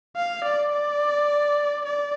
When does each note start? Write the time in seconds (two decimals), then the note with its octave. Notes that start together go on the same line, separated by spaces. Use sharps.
0.17 F5
0.45 D5
0.73 D5
1.86 D5